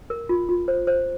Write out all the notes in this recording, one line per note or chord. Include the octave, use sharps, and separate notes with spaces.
A#4
F4
F4
C5
C5